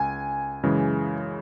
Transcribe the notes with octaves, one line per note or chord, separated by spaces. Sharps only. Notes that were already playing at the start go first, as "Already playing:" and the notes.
Already playing: C#2 G#5
F#2 C#3 E3 G#3